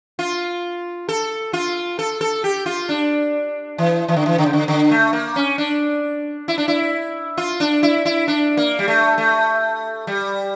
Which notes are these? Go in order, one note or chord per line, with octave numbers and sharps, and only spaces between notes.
F4
A4
F4
A4
A4
G4
F4
D4
E3
E3
D3
E3
D3
C#3
D3
D3
A3
A#3
C#4
D4
E4
D4
E4
F4
D4
E4
E4
D4
A#3
G3
A3
A3
G3